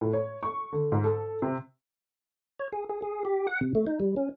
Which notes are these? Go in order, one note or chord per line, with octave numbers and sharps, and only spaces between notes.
A2
C#5
C#6
D3
G#2
A4
C3
C#5
G#4
G#4
G#4
G4
F#5
C3
A3
D#4
G3
C#4